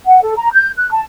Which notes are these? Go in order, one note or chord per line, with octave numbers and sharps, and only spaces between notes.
F#5
A4
A#5
G6
F#6
A5